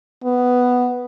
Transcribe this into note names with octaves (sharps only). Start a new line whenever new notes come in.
B3